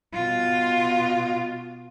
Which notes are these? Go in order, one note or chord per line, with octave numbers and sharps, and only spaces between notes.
B2 F4